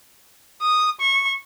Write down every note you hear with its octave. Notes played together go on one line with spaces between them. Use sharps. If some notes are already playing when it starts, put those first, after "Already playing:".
D#6
C#6